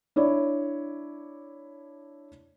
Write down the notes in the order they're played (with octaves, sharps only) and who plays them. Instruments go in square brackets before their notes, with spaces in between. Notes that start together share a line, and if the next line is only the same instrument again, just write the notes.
[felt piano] D4 E4 C#5 D5